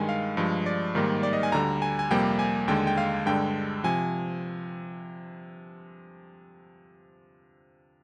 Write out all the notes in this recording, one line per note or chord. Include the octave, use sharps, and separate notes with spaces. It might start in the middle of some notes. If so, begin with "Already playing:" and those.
Already playing: G2 D#3 G#3 G#5
F5
G2 F3 G#3
D5
G#2 D#3 G3 A#3
D5
D#5
G#5
D2 D3 G3 A#5
G#5
G#5
F2 C3 G3 A#3 G5
G#5
D#2 D3 G#3 G5
G5
F5
G2 D3 G#3 G5
C3 F3 G#5